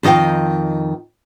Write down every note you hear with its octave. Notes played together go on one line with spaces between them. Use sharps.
F2 D#3 D#5 F5 G5